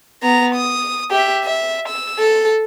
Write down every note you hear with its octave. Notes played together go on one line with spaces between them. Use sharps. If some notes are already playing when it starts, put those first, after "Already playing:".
B3 A#5
D#6
G4 E5
E5
E6
A4